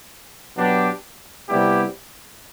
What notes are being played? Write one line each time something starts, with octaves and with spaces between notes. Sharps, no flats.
B2 F#3 B3 D4 G4
C3 G3 B3 E4 G4